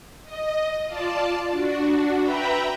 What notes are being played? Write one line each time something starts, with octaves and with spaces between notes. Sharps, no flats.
D#5
F4 D5 A5
D4 F#4
B4 E5 G5 A#5 B5